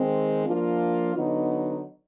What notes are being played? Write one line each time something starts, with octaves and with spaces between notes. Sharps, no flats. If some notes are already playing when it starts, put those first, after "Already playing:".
Already playing: D#3 G#3 C4
F3 A#3 D4 F4
D3 F#3 B3 D#4